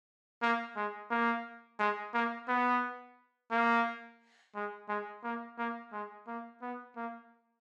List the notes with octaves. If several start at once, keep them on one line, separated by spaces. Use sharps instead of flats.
A#3
G#3
A#3
G#3
A#3
B3
A#3
G#3
G#3
A#3
A#3
G#3
A#3
B3
A#3